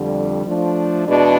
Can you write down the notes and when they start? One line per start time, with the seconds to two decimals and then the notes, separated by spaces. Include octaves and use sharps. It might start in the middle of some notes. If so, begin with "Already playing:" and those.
Already playing: F2 D3 G3
0.45 F3 A3 D4
1.07 E2 B2 G#3 B3 D4